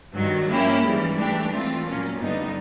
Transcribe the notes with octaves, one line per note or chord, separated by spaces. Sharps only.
G2 D#3 F#3
F3 A#3 C#4 E4 G4
G#2 E3 G3
E3 A3 D4 G4
E3 A3 C4 F4
A#2 F#3 A#3 C#4
G2 D3 G3 B3 D#4